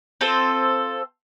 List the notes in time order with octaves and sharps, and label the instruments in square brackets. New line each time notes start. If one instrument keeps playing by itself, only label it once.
[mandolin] C4 F4 A4 C5